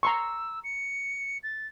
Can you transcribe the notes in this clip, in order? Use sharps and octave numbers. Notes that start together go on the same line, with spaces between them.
A#5 C6 C#6 E6
C#7
A6